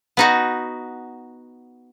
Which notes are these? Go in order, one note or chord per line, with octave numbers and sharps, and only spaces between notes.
B3 D#4 F#4